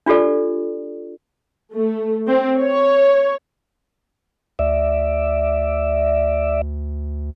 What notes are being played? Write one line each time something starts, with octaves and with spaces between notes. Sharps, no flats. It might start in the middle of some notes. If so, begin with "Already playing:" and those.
D4 F4 G4 A4 D5
A3
C4
C#5
D2 D5 E5